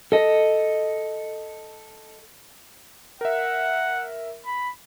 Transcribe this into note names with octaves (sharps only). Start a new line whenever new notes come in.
A4 D#5
A#4 E5 F#5
B5